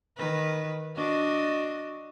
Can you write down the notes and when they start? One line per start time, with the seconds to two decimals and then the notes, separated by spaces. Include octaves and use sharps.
0.18 D#3 B4
0.96 D4 F#4 D#5